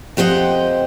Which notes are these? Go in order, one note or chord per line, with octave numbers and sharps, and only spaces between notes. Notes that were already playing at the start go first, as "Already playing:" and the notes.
F2 G4 C5 D#5 F#5